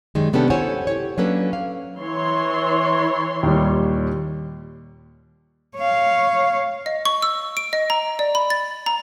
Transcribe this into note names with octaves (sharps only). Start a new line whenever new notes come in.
F#2 D#3 G3 G#3
C3 B3 C#4 D4 G4 A4
E4 A4 C5 C#5 F#5 G#5
G4 C#5
F#3 A#3 C#4 D4 A4 B4
F5
E3 C#5 C6
D#2 A#2 G3
C#5 F5
D#5
C#6
E6
D7
D#5
A#5
D5
B5
A6
A#5